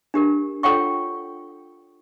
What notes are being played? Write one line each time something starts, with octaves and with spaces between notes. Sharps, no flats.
D4 G4 A#4
F4 A4 C#5 F#5 G5 C#6